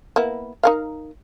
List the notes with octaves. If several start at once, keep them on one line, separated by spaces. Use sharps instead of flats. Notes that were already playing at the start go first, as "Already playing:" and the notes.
A#3 B3 E4
D#4 A#4 F5